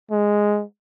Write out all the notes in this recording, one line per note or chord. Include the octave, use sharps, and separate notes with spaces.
G#3